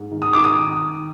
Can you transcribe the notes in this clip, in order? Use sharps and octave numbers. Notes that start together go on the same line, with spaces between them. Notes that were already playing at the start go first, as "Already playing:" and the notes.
Already playing: G#2
D#3
D#6
D#3 D6
D#6